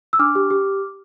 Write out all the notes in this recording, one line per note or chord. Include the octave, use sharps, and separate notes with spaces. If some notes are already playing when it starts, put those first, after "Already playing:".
E6
D4 D6 F6
G4
G4